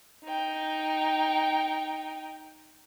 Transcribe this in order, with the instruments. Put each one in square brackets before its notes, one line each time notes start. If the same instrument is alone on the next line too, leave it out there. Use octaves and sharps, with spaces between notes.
[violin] D#4 G5